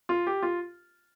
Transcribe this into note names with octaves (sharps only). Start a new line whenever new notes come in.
F4
G4
F4